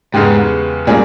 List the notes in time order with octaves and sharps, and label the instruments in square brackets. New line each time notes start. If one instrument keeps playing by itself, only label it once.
[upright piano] E2 C#3 G#3 B3 G4 [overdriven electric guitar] G#2
[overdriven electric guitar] A#2 [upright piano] G3 A#3 C#4 G#4